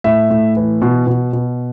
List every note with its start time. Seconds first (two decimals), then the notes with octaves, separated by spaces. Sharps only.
0.04 A2 E5
0.30 A2
0.57 E3
0.82 B2
1.07 B2
1.33 B2